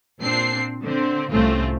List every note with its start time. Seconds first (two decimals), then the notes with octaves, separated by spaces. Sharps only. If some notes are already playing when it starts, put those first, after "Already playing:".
0.21 A#2 C4 D4 C7
0.82 D3 C4
1.31 C2 A2 A3 C4 C#4 F4